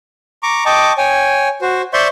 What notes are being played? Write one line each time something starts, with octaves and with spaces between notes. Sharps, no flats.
A#5 C#6 D6
D#5 G5 A5 C#6 D6
C#5 G5 G#5
F#4 C5
C5 D5 E5 C6 C#6 G6